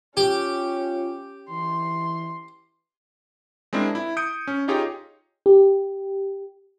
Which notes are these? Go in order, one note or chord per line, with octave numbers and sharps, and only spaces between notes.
C#4 F4 G4
E3 C6
G#3 C4 D4 E4 A#4
E4
D#6 G6 C#7 D7
C#4
D#4 F4 G4 G#4 C#5 D#5
G4